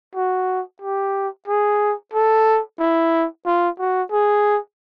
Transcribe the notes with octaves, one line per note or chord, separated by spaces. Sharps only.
F#4
G4
G#4
A4
E4
F4
F#4
G#4